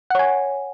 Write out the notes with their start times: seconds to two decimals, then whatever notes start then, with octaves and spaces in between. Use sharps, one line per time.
0.10 F#5
0.15 C#5
0.19 G#5